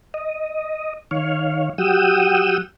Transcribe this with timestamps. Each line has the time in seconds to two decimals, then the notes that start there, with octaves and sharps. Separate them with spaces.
0.14 D#5
1.11 D#3 C#5 F5
1.78 F#3 G4 F#5 G5 D#6 E6